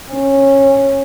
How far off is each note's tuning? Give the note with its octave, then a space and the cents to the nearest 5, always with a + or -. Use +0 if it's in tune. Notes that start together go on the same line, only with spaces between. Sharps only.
C#4 -15